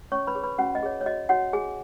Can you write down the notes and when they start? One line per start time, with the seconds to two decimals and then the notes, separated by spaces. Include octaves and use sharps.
0.12 C#4 C#5 C#6
0.27 B4 B5
0.35 G#4 C#5
0.43 B4 B5
0.58 C#4 F#4 F#5
0.75 D#5
0.83 G#4 C#5
1.01 C#5
1.06 F#4 D#5
1.29 F#4 C#5 F#5
1.53 F#4 G#4 G#5